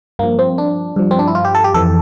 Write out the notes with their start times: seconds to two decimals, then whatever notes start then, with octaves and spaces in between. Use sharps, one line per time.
0.19 G2 F3 A#3
0.39 C4
0.58 D4
0.96 G2 F3
1.11 C4
1.19 D4
1.27 E4
1.35 F4
1.45 G4
1.55 A4
1.64 G4
1.74 F2 E3 A4